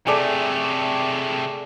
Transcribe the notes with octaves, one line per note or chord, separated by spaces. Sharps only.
C3 A3 G#4 A4 D5